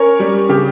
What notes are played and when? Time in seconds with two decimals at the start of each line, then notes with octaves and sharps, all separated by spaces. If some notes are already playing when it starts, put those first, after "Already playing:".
Already playing: C#4 A#4 C#5
0.20 G3
0.49 C#3 G4